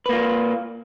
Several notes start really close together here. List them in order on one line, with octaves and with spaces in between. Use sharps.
B4 A#3 F4